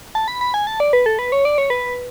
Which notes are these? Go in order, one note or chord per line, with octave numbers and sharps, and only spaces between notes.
A5
B5
B5
G#5
A5
D5
B4
A4
B4
C#5
D5
C#5
B4